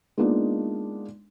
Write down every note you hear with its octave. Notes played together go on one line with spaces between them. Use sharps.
G#3 A#3 B3 D4 D#4 F4